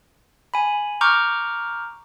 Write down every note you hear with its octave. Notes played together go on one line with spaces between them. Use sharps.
G#5 B5
A#5 C#6 D6 F6 G6